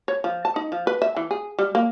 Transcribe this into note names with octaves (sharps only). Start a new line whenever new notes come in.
C#5
F3
A5
D#4
F3
B4
E5
E3
G#4
G3
A#3